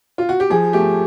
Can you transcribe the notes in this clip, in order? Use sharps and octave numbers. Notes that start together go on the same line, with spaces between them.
F4
F#4
G4
F3 G#4
A3 G4